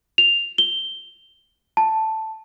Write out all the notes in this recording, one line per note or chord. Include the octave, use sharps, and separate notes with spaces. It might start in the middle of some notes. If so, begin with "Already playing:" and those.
F7
G7
A5